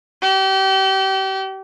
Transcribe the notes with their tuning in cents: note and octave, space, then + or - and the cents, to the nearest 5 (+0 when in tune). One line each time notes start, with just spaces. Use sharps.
G4 -35